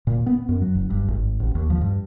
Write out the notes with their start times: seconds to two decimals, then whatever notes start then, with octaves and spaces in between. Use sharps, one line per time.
0.07 A#2
0.26 B3
0.49 F#2
0.62 F#3
0.75 F#1
0.90 G2
1.08 G#1
1.40 A1
1.55 D#2
1.70 F3
1.81 G2